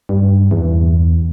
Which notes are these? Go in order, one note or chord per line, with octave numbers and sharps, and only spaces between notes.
G2
E2